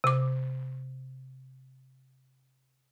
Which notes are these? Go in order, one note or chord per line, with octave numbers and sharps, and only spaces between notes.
C3 D6